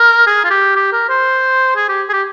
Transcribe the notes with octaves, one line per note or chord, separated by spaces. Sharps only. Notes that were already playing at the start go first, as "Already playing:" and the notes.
Already playing: A#4
G#4
F4
G4
G4
A#4
C5
G#4
G4
G#4
G4